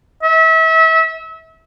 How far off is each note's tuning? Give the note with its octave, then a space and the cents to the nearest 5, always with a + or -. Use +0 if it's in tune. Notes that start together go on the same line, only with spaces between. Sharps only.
E5 -30